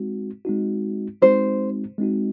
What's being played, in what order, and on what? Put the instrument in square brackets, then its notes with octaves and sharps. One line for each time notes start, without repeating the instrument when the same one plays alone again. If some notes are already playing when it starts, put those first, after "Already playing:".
Already playing: [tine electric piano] G#3 C4 D#4 F#4
G#3 C4 D#4 F#4
[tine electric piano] G#3 C4 D#4 F#4 [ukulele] C5
[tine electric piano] G#3 C4 D#4 F#4